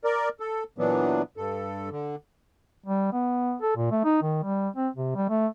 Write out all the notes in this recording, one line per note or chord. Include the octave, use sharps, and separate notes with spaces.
A#4 D5
A4
A#2 E3 F#3 B3 D4
G2 A4
D3
G3
B3
A4
A#2
A3
D#4
D#3
G3
C4
C3
G3
A3